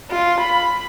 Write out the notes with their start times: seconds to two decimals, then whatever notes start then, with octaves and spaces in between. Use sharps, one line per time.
0.11 F4
0.41 B5